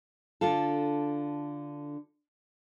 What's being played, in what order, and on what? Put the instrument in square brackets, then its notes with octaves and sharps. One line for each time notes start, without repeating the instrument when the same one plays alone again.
[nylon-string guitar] D3 D4 F4 A4